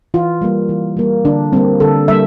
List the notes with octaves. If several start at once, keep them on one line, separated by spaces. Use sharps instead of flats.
E3 F4
G3 A#3
E3
G3 A#3
D3 D4
G3 A#3 C4
D3 A4
G3 A#3 E5